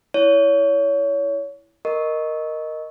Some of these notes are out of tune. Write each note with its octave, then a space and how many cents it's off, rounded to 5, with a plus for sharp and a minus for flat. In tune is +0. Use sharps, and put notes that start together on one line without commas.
E4 +0 C#5 +25
A#4 +0 D#5 +0 C#6 +0